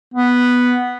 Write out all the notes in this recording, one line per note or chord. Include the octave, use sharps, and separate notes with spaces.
B3